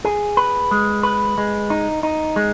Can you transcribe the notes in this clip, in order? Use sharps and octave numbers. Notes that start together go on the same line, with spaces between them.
G#4
B4
G#3
B4
G#3
D#4
D#4
G#3